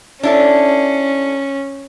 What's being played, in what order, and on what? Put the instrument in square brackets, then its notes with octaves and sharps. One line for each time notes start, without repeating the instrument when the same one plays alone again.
[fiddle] C#4 [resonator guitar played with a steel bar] D4 E4 A4